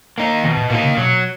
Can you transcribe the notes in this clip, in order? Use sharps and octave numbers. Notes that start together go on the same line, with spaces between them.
A#3 D#4
B2 D#3
A#2
A#2 A#3 D#4
C#3
B2 F#3